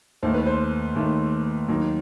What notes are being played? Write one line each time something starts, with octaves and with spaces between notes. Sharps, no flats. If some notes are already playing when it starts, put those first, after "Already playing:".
D#2 D#3 A3 C5
B4
C5
D#2 D#3 A3
D#2 D#3 F#3